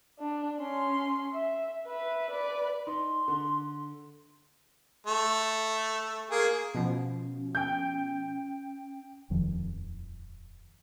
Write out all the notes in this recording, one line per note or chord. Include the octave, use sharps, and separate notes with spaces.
D4
C#4 C6
E5
B4 E5
B4 D5
D#4 C6
D3
A3
A#3 G#4
B2 F3 C#4
G5 G6
D#1 F2 D#3 F3